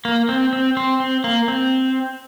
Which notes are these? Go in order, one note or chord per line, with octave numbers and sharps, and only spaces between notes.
A#3
C4
C4
C4
C4
A#3
C4